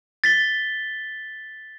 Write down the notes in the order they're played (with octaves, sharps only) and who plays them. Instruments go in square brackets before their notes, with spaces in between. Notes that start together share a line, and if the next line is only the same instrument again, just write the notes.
[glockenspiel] A6 B6 G7